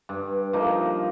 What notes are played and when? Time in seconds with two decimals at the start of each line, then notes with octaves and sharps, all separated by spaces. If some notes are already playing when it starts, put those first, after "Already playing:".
0.09 G2
0.53 F3 A#3 D#4